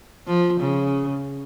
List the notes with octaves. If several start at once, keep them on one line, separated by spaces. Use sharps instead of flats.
F3
C#3